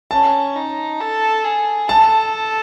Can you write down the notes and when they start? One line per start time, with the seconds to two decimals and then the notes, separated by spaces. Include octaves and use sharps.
0.11 C#4 A5
0.56 D#4
1.00 A4
1.44 G#4
1.88 A4 A5